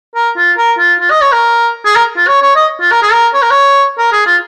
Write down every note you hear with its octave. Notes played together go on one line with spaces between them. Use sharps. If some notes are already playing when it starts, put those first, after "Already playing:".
A#4
F4
A#4
F4
F4
D#5
C#5
A#4
G#4
A#4
F4
C#5
C#5
D#5
F4
A#4
G#4
A#4
C#5
A#4
C#5
A#4
G#4
F4